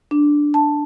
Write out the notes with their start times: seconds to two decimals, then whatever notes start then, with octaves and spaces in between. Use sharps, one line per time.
0.11 D4
0.54 A5